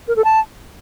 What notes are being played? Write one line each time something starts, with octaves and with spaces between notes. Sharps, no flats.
A#4
A4
A5